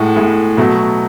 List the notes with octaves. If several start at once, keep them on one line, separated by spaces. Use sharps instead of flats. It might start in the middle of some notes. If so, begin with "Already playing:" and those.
Already playing: A2 G#3 F#5
A2 G#3
B2 F#3 A3